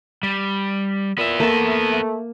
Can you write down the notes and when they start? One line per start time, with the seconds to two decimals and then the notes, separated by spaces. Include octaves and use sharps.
0.23 G3
1.18 A#2 B3 E5
1.40 A3 A#3 A5